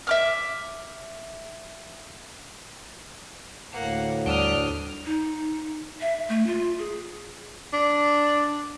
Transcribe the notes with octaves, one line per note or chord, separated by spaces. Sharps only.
E5 D6 F6
D2 A2 A#3 F#5
D#2 G3 D4 F#5 D#6 F6
D#4
E5
A3
F4
G#4
D4